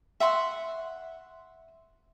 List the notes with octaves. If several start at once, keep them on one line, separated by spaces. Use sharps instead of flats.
E5 F#5 C6 C#6